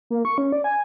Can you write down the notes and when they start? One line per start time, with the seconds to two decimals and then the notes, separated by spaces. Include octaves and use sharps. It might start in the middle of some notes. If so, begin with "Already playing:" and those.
0.10 A#3
0.25 C#6
0.38 C#4
0.52 D5
0.64 G#5